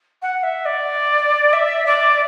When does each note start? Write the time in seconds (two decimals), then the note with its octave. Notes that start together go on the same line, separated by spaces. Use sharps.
0.22 F#5
0.43 E5
0.65 D5
1.53 E5
1.86 D5